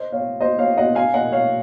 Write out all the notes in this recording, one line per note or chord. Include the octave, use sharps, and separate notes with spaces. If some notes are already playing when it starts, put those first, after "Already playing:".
Already playing: C5 D#5
C#5 F5
C5 D#5
C#5 F5
D#5 F#5
F5 G#5
D#5 F#5
C#5 F5